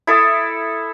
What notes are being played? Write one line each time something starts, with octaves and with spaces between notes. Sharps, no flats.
E4 A4 D#6